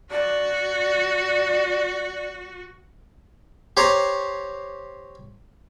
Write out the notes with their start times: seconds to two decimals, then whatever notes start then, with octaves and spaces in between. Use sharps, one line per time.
0.11 F#4 D5
3.77 G4 C5 C#5 A#5